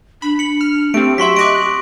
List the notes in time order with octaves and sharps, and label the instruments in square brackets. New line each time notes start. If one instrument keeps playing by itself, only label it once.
[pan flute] D4 [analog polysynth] B5
[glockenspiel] C#7 F#7
[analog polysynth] F6
[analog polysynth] A3 C4 [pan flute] G4 [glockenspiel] D7
[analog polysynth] F#3 E5 [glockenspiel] C6 C#6 B6
[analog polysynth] D#5 F#6 [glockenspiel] D6 A#6 D7